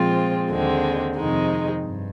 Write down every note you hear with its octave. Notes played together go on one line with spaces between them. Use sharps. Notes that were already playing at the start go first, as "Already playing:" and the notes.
Already playing: A#2 F3 G#3 C4 F4
D#2 D3 G#3 C4
F2 C3 D#3 G#3 D#4
G2